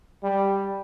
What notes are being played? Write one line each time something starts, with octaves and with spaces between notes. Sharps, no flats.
G3